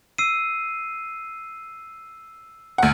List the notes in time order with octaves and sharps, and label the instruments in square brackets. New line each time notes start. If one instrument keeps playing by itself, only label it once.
[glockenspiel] E6 C7 D#7
[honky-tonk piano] D2 F#5